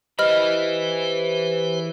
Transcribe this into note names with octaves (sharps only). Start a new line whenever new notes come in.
E3 G4 B4 C5 D#5 B5 F6